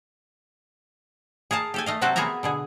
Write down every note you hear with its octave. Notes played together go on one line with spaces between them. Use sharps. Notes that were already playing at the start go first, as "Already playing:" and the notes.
G#4 A#4 F5 A5
G4 A4 G#5
A3 D#5 F5
C3 F#3 C4 F#4 A4 F#5
A#3 B3 G#4 E5 G#5 A#5
B2 D3 G#4